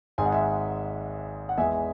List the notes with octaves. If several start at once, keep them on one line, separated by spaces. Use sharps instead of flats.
G#1 G#2 G#3 G#5
F#5
E5 G#5
F#5
E2 E3 G#3 E5 G#5